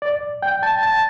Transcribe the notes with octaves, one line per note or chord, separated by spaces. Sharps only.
D5
G5
A5
A5